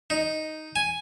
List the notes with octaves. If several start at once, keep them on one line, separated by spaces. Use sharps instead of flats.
D#4
G#5